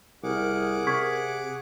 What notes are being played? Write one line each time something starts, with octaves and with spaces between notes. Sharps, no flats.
C2 G#4 A#4 F#5 D6
C3 C#6 G#6 B6